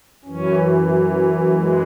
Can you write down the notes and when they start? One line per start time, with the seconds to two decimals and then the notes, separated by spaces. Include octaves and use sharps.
0.25 F#2 E3 C#4
1.53 G#3